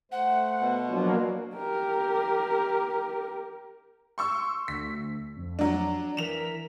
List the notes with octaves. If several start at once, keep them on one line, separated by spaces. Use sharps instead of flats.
A3 C5 F#5
B2
F3 F#3 A#3 D4 F4
G4 A#4
C6 C#6 E6
D2 B6
F2
F#3 D4
E3 A#4 B6 E7 F7